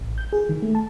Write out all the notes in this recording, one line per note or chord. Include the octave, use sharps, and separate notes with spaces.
A1
G6
G#4
D#3
A3
A5